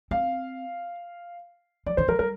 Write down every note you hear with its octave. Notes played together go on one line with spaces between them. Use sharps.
C4 F5
F3 D5
D#3 C5
F3 A#4
G3 A#4